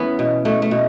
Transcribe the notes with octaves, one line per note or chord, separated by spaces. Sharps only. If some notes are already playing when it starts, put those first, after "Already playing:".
Already playing: E3 B3 C#4 E4
B2
B2 A3
A3
B2